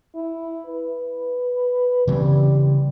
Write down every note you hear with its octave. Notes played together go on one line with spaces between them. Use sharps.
E4
B4
C#3 E3 G3 C4